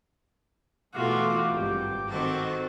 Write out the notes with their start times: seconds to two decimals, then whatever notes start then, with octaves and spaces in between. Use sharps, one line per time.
0.94 B2 E3 G#3 A3 F4 F#4 D6
1.50 G#1 G2 G4 G5 A#5 D6
2.09 D#3 C4 F#4 A4